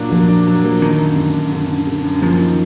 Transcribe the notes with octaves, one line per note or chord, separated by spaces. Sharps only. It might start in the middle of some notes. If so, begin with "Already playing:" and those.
Already playing: A#2 F#3 A#3 D4
F3 A#3
D4
F#3
A#3
D3 D#3
F#2
D3
F#2
D3
D3
D3
F#2
F3 A#3
D#3